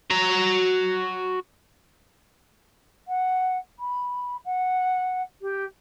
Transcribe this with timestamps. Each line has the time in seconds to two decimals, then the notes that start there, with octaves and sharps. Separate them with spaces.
0.10 F#4 A#5
3.07 F#5
3.79 B5
4.45 F#5
5.41 G4